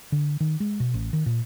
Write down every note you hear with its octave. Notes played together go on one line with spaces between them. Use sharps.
D3
D#3
G#3
B2
A1
D#3
A#2